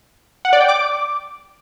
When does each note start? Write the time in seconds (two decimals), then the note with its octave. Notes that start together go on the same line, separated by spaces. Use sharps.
0.45 F#5
0.53 D5
0.61 G5
0.68 D6